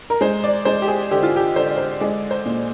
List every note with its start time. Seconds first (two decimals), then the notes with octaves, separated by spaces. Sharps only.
0.10 A#4
0.21 G#3 C5
0.44 D5
0.65 G#3 C5
0.82 G4
0.88 G#4
1.11 D3 G4
1.23 F4
1.36 G4
1.56 D3 C5
1.66 D5
1.77 C5
2.00 G#3 D5
2.31 C5
2.46 A#2